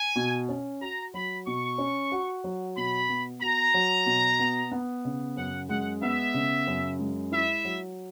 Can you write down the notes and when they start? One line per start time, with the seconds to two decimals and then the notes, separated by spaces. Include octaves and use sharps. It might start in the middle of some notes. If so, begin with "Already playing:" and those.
Already playing: G#5
0.16 B2
0.49 C#4
0.81 F#4 A#5
1.14 F#3 B5
1.47 B2 C#6
1.78 C#4
2.12 F#4
2.44 F#3
2.76 B2 B5
3.09 B3
3.41 F#4 A#5
3.74 F#3
4.06 B2
4.39 B3
4.72 B3
5.05 C#3
5.37 F#2 F#5
5.69 G#3 F#5
6.02 B3 E5
6.34 C#3
6.67 F#2
6.99 G#3
7.32 E4 E5
7.65 F#3